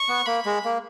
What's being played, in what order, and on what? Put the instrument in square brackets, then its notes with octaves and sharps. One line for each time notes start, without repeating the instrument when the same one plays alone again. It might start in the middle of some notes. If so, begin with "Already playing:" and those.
Already playing: [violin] C#6
[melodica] B3
[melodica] A#3 [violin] B5
[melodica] G#3
A#3